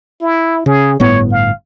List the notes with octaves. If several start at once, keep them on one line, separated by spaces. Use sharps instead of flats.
E4
C#3 G#4
G1 A2 B3 C#5
F5